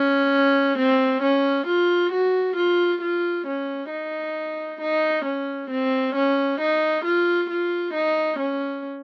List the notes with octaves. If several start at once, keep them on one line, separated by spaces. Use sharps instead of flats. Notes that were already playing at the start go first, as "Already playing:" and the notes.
Already playing: C#4
C4
C#4
F4
F#4
F4
F4
C#4
D#4
D#4
C#4
C4
C#4
D#4
F4
F4
D#4
C#4